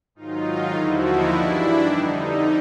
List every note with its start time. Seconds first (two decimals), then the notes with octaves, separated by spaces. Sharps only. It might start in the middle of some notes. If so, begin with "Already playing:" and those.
0.15 G#2 D#3 F#3 D#4 F4
0.72 D#2 D3 F3 E4 F#4
1.01 D#4 F4
1.29 G2 E3 G3 D4 E4
1.86 F2 D3 G3 D#4